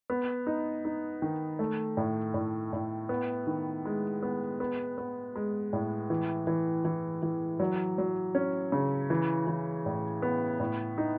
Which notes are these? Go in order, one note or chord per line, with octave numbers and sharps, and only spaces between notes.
B3
D#4
D#4
D#3
A3
A2
A2
A2
B3
D#3
G#3
B3
B3
B3
G#3
A2
E3
E3
E3
E3
F#3
F#3
C#4
C#3
E3
E3
A2
B3
A2
D#4